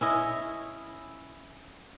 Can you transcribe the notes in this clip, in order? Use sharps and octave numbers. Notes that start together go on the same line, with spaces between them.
C#4 E4 D#5